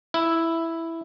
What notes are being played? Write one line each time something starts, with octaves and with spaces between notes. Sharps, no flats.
E4